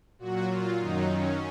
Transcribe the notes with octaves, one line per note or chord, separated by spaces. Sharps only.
A#2 F#3 F#4
F4
F#2 D#3 F#3 D#4
C#4